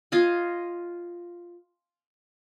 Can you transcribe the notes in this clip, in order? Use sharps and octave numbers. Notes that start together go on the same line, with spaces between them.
F4 D#5 G#5